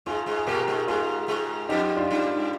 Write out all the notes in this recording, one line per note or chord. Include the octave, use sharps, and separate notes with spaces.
G#2 G#3 F4 G#4
G#2 G#3
G#4
A#2 A#3 G4 A#4
G#2 G#3
G#2 G#3 F4 G#4
G#2 G#3
F2 F3 D#4 G4
D4 F4
G2 G3